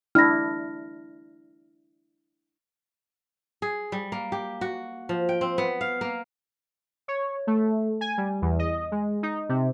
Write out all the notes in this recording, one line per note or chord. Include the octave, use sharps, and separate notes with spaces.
D4 E4 F6 A#6
G#4
G3
A#3
G4
F#4
F3
G5
C4
B3
F5
A#3
C#5
A3
G#5
G3
E2
D#5
G#3
D#4
C3